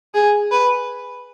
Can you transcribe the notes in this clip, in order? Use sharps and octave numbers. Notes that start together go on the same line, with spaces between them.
G#4
B4